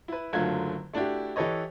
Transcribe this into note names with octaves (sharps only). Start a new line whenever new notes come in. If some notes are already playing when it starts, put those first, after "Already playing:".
E4 B4
F#1 D3 F#3 A3 F4 G#6
A3 D4 E4 F#4 G4
E3 G4 A4 B4 C#5 D#5